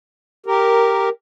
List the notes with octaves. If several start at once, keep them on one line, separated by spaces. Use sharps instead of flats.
G4 A#4